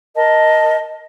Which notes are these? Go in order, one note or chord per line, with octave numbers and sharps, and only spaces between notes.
A#4 D#5 A5